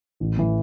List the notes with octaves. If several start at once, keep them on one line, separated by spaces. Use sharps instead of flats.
A1
A2 E3